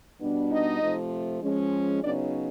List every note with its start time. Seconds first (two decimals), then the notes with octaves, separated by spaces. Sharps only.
0.20 B2 G3 B3 D4
0.50 D#4 D#5
0.81 C3 F3 A3
1.42 F3 G#3 C#4
2.03 C#3 F#3 B3 D4 D#4 D5